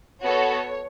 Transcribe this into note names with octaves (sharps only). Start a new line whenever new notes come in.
B3 F#4 A4 C#5